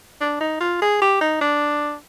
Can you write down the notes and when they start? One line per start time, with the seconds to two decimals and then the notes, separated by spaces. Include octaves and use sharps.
0.21 D4
0.40 D#4
0.61 F4
0.82 G#4
1.01 G4
1.21 D#4
1.41 D4